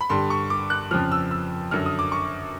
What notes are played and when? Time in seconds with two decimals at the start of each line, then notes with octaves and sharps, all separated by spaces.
0.01 B5
0.10 G2 D3 G3 C6
0.30 C#6
0.50 D6
0.70 F#6
0.91 F2 C#3 F3 F6
1.12 E6
1.31 E6
1.71 F#2 D3 F#3 F6
1.86 D#6
1.99 D6
2.12 C#6